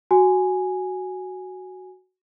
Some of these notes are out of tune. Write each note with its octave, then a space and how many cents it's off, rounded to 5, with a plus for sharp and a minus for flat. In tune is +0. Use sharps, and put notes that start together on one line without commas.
F#4 +0 G#5 +0